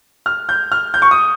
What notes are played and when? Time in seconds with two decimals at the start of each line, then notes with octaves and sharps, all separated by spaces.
0.26 F6
0.49 G6
0.72 F6
0.94 G6
1.02 C#6
1.11 D#6